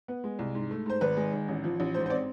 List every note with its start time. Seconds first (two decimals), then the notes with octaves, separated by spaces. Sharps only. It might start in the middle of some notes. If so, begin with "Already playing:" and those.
0.08 B3
0.24 G#3
0.39 C2
0.55 G#2
0.71 A3
0.86 G#2 C5
1.01 G#1 B4
1.16 G#3
1.33 G#1
1.48 A1
1.64 F3
1.80 A1
1.94 G#2 C5
2.06 C5
2.10 C4 D5